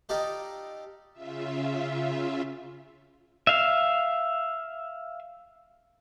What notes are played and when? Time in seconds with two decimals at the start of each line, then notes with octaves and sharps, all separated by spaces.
0.09 D#4 F4 G4 A4 D5 D#5
1.13 C#3 F4 E5
3.47 E5 F5